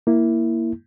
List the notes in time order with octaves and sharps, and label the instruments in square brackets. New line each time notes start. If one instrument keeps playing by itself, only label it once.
[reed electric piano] A#3 E4